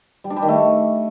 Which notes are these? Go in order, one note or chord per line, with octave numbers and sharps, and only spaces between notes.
G3
D4
G3
D#3
A3